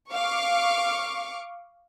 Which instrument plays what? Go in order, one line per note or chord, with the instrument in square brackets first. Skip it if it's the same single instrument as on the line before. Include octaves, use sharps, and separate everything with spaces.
[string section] F5 C#6 D6